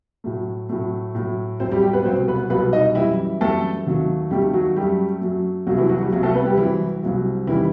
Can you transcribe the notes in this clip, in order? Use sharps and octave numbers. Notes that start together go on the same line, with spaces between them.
A2 F#3 A3
A2 F#3 A3
A2 F#3 A3
A2 F#3 A3 C4 C5
G3 G4
G3 G4
B3 B4
C2 B2 F#3 C4 C5
B3 B4
C2 B2 F#3 B3 B4
D#4 D#5
F#2 E3 G3 E4 E5
F#2 E3 G3 A3 A4
D#2 D#3 F#3 A3
D#2 D#3 F#3 G3 A3 G4
F#3 F#4
F#2 F#3 G3 A3 G4
F#2 F#3 A3
C2 C3 F#3 A3 F#4
E3 E4
F#3 F#4
G3 G4
C2 C3 F#3 A3 F#4
A3 A4
B3 B4
G3 G4
C2 C3 E3 F#3 E4
C2 C3 F#3
E2 D#3 E3 G3 E4